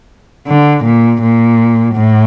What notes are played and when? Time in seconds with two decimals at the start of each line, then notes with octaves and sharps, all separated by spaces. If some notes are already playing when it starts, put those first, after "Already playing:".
0.48 D3
0.85 A#2
1.22 A#2
1.95 A2